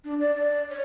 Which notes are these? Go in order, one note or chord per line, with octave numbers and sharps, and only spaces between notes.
D4
D5
D5
C#5